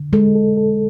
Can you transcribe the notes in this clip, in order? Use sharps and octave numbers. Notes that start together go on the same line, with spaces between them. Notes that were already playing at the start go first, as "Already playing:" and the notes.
Already playing: D3
G#3 A4
A4
A4